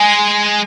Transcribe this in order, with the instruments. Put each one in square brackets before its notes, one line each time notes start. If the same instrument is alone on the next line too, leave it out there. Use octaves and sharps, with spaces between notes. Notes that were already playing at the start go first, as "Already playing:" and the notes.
Already playing: [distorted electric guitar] G#3 [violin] G#5